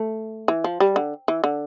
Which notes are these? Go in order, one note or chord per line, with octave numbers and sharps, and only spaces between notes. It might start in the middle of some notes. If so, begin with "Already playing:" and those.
Already playing: A3
E3
F3
G3
D3
E3
D3